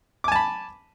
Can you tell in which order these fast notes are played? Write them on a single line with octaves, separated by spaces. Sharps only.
D6 G#5 A5 B5